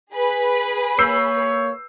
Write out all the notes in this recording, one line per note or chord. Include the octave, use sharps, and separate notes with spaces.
G#4 B4 B5
A#3 C#5 E6 G6 C7